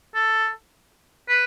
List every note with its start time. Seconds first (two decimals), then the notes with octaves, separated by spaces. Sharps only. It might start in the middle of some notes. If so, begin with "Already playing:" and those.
0.15 A4
1.28 B4